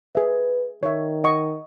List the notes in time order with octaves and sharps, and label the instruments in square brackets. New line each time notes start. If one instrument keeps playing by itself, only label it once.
[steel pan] G#4 E5 [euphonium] B4
[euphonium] D#3 [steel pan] C#5 E5
[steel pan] D#5 F#5 C#6